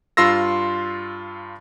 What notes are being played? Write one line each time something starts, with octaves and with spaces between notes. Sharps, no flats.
G2 F4 C6 E6 A#6